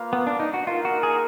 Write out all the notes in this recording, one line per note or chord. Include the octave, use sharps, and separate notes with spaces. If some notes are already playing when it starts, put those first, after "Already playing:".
Already playing: A#3 F4 B4 F5
B3
D4
D#4
F#4
A#3 D#4 F4 A#4
F#4
G#4